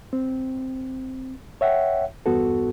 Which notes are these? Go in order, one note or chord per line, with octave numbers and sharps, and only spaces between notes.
C4
C#5 E5 F#5 G5
E2 G2 B3 F#4 A4